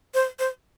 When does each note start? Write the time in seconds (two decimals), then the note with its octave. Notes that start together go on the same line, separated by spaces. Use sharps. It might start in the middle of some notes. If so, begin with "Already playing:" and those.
0.14 C5
0.39 C5